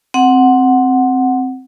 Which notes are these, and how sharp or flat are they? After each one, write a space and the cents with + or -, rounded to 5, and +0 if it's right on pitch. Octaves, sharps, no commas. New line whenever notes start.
C4 +0 F#5 +0